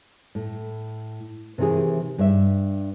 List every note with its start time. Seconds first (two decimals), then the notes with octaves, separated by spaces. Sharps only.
0.35 A2
1.58 C3 D#3 E3 G4 G#4
2.18 G2 E5